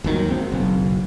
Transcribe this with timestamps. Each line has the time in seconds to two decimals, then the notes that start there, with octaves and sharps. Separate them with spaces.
0.04 G1 D#2 D#3 F#3
0.29 G#1 C4
0.52 F#1 B1